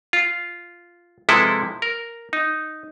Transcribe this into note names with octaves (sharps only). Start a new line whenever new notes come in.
F4
C3 F3 G#3 E4 A4 B4
A#4
D#4